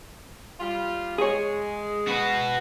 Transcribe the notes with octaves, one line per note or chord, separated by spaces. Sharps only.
G3 F4
G#3 G#4 C#5
F#4 B4